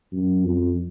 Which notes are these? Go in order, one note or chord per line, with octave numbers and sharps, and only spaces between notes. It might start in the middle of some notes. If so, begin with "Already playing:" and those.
F#2
F2